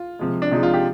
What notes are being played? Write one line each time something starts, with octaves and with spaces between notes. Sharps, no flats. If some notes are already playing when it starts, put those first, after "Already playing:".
Already playing: F4
C3 F3 G#3
D4
C3 F3 G#3 D#4
F4
G4